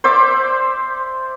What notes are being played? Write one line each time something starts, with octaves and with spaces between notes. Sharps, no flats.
C5 D5 E5 D6